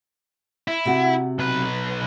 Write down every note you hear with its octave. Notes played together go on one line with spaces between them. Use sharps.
E4
C3 F#4 F#5
B1 B4